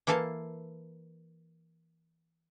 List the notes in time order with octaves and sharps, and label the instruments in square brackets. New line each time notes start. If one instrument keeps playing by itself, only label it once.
[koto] E3 A#3 A4 F5 A5